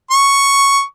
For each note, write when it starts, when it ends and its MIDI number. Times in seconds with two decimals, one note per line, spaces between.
0.11 0.82 85